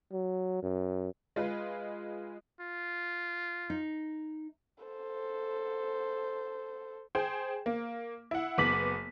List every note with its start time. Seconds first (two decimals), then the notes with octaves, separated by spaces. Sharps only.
0.12 F#3
0.62 F#2
1.36 G#3 F4 B4
2.60 F4
3.70 D#4
4.84 A4 C5
7.15 G#4 C5 G5
7.66 A#3
8.31 E4 F#5
8.58 F#1 B3 D6 B6 F#7